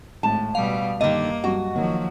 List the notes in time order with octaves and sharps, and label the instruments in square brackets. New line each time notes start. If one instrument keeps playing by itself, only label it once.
[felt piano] G#1 [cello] A2 [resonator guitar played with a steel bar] A5
[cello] B2 G3 [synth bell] F5
[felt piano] G2 [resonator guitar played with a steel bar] D3 D#3 [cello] A#3 [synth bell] D#5
[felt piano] G2 F#3 [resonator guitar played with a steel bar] F#4
[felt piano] D#3 A#3 [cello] F3 F#3